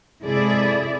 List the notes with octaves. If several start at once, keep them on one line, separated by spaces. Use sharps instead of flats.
C3 G#3 E4 G#4 A4 D5